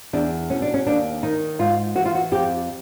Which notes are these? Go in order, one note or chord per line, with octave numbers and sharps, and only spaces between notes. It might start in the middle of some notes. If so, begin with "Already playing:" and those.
E2 D4
B2 C#4
D4
C#4
D#2 D4
D#3 D#4
G#2 F4
E3 F#4
F4
F#4
F2 G4